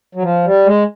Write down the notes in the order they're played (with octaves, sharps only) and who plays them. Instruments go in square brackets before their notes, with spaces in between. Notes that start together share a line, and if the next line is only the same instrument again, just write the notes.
[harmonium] F#3
F3
G3
G#3